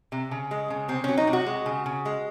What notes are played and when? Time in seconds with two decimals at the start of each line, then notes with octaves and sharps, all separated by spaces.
0.12 C3
0.31 C#3
0.51 G#3
0.70 C#3
0.88 C3 C4
1.04 F#3 C#4
1.17 D#4
1.27 C3
1.33 F#4
1.46 G#3
1.66 C#3
1.86 C#3
2.05 G#3